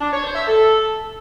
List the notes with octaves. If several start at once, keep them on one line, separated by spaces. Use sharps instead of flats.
D4
C#5
C5
E5
A4